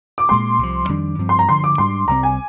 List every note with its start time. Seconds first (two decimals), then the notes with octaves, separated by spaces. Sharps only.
0.18 D6
0.29 A#2 G#3 C4 C6
0.59 C2 C3 F3
0.88 F2 D#3 G3 D4
1.19 G2 F3 C4
1.29 C6
1.39 A#5
1.49 G2 D3 F3 C6
1.64 D6
1.78 G#2 G3 D4 C6
2.08 C2 C3 G3 C4 A#5
2.23 G#5